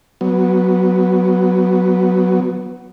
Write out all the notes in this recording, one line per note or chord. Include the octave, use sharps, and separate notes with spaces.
F#3 B3